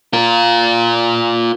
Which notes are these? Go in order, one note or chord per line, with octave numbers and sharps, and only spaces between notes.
F4 A#4